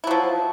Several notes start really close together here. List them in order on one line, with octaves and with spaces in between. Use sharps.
E4 F#3 F3